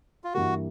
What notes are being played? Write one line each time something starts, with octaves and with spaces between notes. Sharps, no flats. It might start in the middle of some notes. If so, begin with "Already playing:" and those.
F4
G2 E3 G3 A#3 F#4